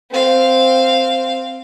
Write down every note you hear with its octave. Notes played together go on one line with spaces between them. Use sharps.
C4 F5